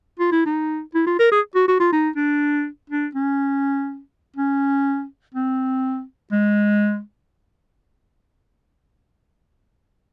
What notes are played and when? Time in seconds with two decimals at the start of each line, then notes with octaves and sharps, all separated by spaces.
0.20 F4
0.32 E4
0.46 D#4
0.95 E4
1.07 F4
1.20 A#4
1.32 G#4
1.55 F#4
1.68 F#4
1.80 F4
1.93 D#4
2.16 D4
2.90 D4
3.15 C#4
4.37 C#4
5.35 C4
6.32 G#3